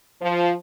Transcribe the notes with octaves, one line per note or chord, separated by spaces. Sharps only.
F3